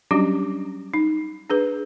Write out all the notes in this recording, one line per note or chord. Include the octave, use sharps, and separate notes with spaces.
F#3 G3 C#4 D4 F#4 G4
D#4
D4 G#4 B4